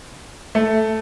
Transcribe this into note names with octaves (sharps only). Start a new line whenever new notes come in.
A3